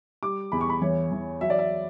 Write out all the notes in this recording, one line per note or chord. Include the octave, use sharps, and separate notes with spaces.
G3 D6
E2 B5
C#6
B5
E3 C#5
E3
F#3 E5
D5
E5